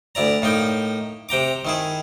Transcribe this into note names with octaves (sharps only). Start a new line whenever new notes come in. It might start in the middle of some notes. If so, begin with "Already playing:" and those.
D2 E4 D5 A#5
A2 A#3 D#4 G5
C3 G5 A#5 D6
D#3 E4 G#4